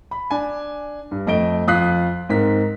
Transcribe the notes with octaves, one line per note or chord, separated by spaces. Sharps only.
B5
D4 G#5
G2
F2 A3 D#5 D7 G7
F2 F4 D#6 F#6 B6 C7
G#2 C4 A#4 B6